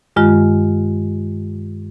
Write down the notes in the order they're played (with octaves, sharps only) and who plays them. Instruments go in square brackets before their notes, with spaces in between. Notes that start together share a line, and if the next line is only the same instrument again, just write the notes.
[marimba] G2 D#3 G#3 F4